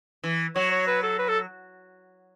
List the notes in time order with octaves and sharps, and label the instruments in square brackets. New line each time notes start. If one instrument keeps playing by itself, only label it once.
[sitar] E3
[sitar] F#3 [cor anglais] C#5
[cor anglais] C#5
B4
A4
B4
A4